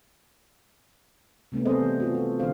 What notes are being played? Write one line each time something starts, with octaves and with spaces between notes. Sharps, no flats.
C3 A3 B3 C#4
G3 C4 G#4 A4 C5 D#5
E3
F4 F#4
A4
B2 D3 D#3 C5 F5